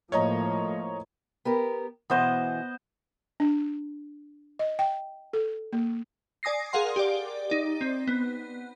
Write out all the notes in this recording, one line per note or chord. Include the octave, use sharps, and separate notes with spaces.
A2 F3 A#3 C#5 D#5 A#5
B3 G4 A#4
B2 E3 B3 C5 D#5
D4
D#5
G5
A4
A#3
D5 G#5 D#6 A#6 C7
G#4 A#4 F5 F#5 C6
G4 D5
D#4 D5
C4
B3